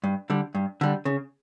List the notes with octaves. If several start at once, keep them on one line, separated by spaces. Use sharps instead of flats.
G2
D3 G3
G2
D3 G3
C#3